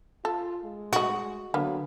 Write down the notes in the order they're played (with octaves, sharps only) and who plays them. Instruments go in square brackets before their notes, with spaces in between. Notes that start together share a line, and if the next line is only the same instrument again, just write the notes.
[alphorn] F4 [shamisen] A4
[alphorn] G#3
[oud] F#4 [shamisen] D#5 F#5
[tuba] D3 [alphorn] F#3 [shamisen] A#3 B3